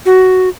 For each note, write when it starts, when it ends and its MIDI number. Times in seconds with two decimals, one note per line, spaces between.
0.06 0.49 66